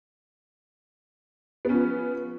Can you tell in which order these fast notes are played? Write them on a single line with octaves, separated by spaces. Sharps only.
B3 C#4 F3